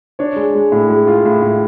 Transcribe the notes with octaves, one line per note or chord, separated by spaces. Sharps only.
D4 C#5
G#3
G#3
A2
G#3
F4
A2
A2